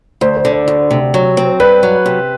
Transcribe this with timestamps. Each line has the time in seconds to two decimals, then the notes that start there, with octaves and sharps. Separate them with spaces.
0.21 D2 C5
0.37 C5
0.45 D3
0.52 D5
0.68 D2
0.91 C3
1.14 F#3
1.37 C4
1.60 G2 B4
1.83 F#3
2.06 C3